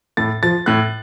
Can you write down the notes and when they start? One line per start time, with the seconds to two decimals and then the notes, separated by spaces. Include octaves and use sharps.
0.17 A2 A6
0.43 F3 A6
0.66 A2 F#6